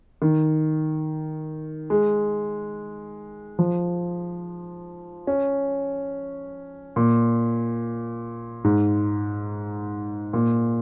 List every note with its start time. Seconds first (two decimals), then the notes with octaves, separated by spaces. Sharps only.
0.22 D#3
1.90 G#3
3.59 F3
5.27 C#4
6.96 A#2
8.64 G#2
10.33 A#2